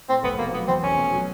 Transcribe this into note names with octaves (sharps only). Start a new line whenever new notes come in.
A2 C4
F1 B3
B2 A#3
F#3 B3
E2 C4
F1 C#4
B2
F#3